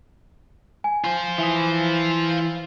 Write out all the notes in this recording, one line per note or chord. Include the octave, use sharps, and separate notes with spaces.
G#5
F4 C5
E3 E5 G#5 D#6